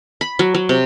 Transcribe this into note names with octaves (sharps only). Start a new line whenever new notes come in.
B5
F#3
F#3
C3